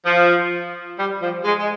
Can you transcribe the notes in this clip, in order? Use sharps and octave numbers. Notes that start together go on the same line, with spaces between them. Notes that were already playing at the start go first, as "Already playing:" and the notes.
F3
G3
F3
G#3
G#3